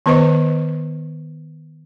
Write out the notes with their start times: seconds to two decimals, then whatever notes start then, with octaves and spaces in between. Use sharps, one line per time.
0.06 D#3 B3 B4 C5 D#5 C#6